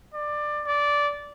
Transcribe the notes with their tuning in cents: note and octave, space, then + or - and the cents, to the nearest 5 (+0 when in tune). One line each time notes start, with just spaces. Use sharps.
D5 +20
D5 -15